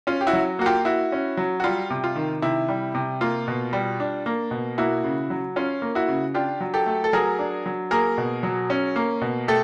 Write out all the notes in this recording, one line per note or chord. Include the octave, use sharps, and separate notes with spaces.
C#4 F4
G4
E4 F#4
F#3
A#3 F#4
F4 G4
E4 F#4
C#4
F#3
F#4
G3 F4
C3
F4
D#3
C3 E4
G3
C3
A#3 F4
B2
G3
D4
A#3
B2
A#3 E4 F#4
C#3
F#3
C#4 F4
A#3
E4 F#4
C#3
D4 F4 G4
F#3
G4 A4
A3
A4
F#3 G#4 A#4
D4
F#3
A#3 G#4 A#4
B2
F#3
C#4
A#3
B2
A3 G4 A4